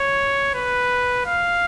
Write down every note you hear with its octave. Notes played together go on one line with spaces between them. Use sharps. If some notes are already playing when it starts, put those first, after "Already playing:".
Already playing: C#5
B4
F5